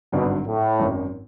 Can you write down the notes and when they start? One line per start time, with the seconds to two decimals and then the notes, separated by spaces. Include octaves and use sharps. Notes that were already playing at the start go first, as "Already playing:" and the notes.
0.12 G#1 G2 B2 D3 F#3
0.46 A2
0.79 G#1 F#2 D#3